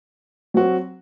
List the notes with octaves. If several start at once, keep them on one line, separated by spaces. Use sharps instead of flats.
F#3 C4 F#4